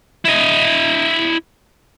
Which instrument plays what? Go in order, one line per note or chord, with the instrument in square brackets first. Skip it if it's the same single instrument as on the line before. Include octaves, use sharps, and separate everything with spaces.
[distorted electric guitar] E4 D#5